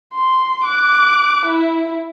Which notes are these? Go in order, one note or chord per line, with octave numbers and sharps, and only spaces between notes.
C6
D6 F#6
E4